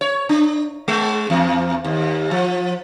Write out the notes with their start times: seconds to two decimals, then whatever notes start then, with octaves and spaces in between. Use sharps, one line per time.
0.01 C#5
0.29 D4
0.88 G#3
1.30 E2
1.84 D#2
2.31 F3